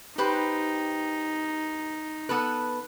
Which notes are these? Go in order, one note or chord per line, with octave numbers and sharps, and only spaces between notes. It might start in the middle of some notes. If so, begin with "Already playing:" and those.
D#4 G4 B4 C5
B3 A4 B4